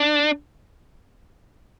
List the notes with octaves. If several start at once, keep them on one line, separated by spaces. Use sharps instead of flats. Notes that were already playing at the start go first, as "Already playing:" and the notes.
Already playing: D4